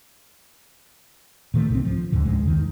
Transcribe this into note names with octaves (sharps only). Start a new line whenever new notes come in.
A#2 D#3 G3 A3
C2 G#2 G#3 C4
F3
D2 G#2 D3
C#2 C#3 G#3
E2 D#3